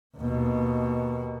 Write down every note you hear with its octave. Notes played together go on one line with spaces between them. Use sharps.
D#2 B2